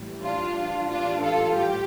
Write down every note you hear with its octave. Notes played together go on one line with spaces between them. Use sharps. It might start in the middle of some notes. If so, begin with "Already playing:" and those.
Already playing: A2 E3 G3
D4 F4
A2 E3 G3 D4 F4
F4 A4
G4